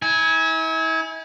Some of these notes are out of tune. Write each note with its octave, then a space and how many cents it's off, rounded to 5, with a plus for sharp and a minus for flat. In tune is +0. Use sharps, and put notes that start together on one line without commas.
E4 -40 G#5 +0